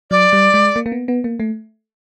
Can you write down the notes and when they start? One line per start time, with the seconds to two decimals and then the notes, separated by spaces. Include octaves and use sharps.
0.11 F#3 D5
0.33 G3
0.54 G#3
0.76 A#3
0.86 A#3
0.92 B3
1.08 B3
1.24 A#3
1.40 A3